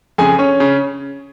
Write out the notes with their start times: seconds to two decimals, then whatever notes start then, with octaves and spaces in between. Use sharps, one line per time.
0.18 F2 C#3 G#4 G#5
0.39 C#4 C#5
0.60 C#3